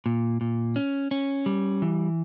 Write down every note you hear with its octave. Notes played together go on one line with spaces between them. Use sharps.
A#2
A#2
C#4
C#4
G3
E3